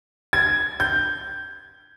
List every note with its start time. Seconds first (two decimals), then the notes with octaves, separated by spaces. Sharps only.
0.33 G#6
0.80 G6